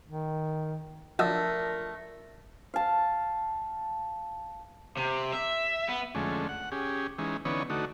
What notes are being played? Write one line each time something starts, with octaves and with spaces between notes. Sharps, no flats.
D#3
F3 A3 D4 F#4 A#4 D#5 E6
F5 A5
C3
E5
B3
F2 D3 G#3 A3 C#4
F#5
C#4 G4 G#4
E3 G#3 C#4 D#4
D3 E3 B3 C#4 D#4 C#5
D3 A3 D#4 F#4